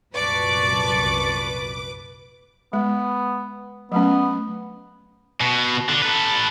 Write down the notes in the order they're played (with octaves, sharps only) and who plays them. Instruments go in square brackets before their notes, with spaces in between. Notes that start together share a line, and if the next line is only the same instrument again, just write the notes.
[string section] C2 F#2 A#2 [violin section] B4 D6 [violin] D5 [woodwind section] A5 C#6
[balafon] G#3 [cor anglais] B3
[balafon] F#3 A3 C#4 [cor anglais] B3
[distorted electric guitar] B2
D3 D4
A4 B4